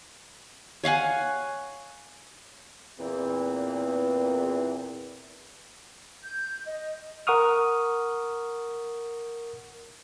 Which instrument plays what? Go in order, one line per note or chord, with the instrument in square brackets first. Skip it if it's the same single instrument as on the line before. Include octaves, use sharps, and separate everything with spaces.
[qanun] C#5 F5 F#5 G#5
[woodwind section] E2 A#2 E3 C4
[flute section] G6
D#5
[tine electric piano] A#4 F#5 C#6 D#6 F6